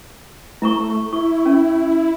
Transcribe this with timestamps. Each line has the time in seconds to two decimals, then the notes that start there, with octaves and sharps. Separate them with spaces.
0.62 A3 E4 A#5 C#6
1.13 E4 C#6
1.45 C#4